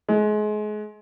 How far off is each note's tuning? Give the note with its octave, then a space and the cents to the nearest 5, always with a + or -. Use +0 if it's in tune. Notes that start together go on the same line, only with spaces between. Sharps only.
G#3 +30